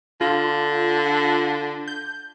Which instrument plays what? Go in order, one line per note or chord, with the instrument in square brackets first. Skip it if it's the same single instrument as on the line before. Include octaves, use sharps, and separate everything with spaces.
[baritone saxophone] D3 [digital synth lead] F4
[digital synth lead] G6